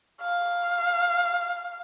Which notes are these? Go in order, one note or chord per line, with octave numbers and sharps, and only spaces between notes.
F5